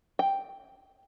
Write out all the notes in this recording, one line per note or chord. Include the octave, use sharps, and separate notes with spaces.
G5